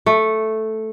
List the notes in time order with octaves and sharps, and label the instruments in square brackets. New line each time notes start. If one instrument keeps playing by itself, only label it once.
[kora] A3